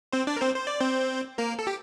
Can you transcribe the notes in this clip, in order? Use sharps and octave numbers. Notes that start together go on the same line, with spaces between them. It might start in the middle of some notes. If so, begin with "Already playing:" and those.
C4 C5
D4 D5
A#4
C4 C5
C5
D5
C4 C5
A#3 A#4
A4
G4